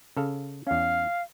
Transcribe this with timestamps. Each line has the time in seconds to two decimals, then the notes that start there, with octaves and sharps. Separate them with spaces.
0.17 C#3 A4 F5
0.67 E2 C#4 F5